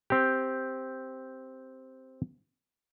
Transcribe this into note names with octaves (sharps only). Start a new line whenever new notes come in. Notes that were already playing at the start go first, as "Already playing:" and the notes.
C4 G4